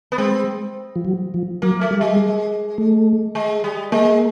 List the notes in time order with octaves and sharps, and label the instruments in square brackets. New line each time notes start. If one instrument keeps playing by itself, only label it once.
[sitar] B3
[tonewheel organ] G#3 [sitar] C4
[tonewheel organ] F3
F#3
F3
[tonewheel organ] F#3 [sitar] A#3
[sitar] A3
[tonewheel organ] G3
[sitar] G#3
[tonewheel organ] A3
[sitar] G#3
G3
[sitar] G#3 [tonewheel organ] A#3